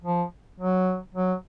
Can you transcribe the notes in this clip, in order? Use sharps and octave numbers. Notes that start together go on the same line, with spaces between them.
F3
F#3
F#3